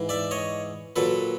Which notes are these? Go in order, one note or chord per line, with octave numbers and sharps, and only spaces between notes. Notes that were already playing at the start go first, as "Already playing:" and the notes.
Already playing: G#2 E3
D5 E5
C#5 D#5
A#2 F#3 A4 B4